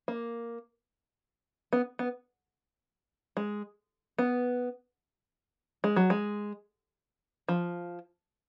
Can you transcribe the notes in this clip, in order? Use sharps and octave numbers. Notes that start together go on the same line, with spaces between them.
A#3
B3
B3
G#3
B3
G#3
F#3
G#3
F3